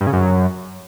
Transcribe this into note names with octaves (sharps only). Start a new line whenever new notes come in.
G2
C#3
F#2